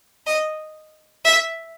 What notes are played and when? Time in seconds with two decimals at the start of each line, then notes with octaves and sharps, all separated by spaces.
0.26 D#5
1.24 E5